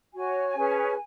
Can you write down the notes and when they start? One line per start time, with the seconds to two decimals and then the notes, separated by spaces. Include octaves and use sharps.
0.13 F#4 C#5 G#5
0.55 C#4 G#4 B4